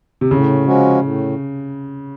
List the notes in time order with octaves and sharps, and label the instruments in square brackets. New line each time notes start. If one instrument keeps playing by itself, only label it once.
[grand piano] C3
[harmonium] A2 [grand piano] C#3
[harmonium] F3 G#3 C#4 F#4
A2